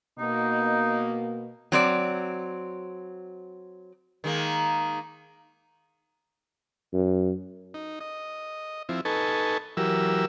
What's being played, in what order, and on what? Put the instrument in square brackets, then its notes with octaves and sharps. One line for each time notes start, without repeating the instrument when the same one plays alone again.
[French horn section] B2 A#3 [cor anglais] D#4
[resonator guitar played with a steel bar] F#3 C4 D5
[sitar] D#3 G#3 A#3
[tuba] F#2
[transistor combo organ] D#4
D#5
F3 C4 E4
D#4 A4 B4 G#5 A5 C#6
E3 F#3 G4 A#4 E6